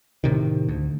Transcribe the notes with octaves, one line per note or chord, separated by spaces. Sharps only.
A2 C3 D#3
D2